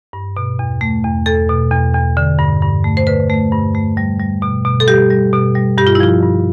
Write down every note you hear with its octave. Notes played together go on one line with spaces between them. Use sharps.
G2
B2
E2
A3
E2
E2 A4
B2
E2
E2
D3
G2
G2
A3
C5
D3 B4
A3
G2
A3
G3
G3
B2
B2
A4
G3 G4
G3
B2
G3
G2 G4
F4
E4
F3 F4
G2